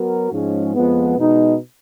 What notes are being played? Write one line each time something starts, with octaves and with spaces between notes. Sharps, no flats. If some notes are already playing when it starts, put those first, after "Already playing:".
Already playing: F#3 B3 F#4 A#4
G#2 F3 G#3 C#4
F2 F3 G#3 B3
B2 G#3 D#4